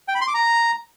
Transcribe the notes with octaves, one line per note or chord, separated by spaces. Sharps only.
G5
B5
C6
D6
A#5